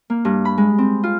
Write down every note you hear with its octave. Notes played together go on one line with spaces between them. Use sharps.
A#3
G2
B5
G#3
C4
F4